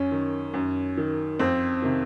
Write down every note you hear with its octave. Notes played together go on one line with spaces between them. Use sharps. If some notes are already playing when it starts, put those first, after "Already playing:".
Already playing: F#2 C#4
D#3
F#2
D#3
F2 C4
C3 D#3